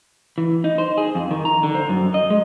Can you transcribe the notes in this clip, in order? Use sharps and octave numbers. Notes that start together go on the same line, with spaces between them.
E3
D#4
C5
G#4
F2
D#3
A#5
D3
C5
F#2
D#5
G#3